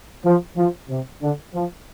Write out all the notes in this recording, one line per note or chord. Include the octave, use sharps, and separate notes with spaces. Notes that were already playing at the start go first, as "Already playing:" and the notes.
F3
F3
C3
D3
F3